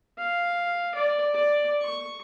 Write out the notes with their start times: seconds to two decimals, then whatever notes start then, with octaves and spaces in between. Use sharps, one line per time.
0.18 F5
0.95 D5
1.34 D5
1.82 C#6